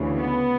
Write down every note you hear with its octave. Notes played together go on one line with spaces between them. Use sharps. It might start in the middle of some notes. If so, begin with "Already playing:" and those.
Already playing: D2 C#3 E3
B3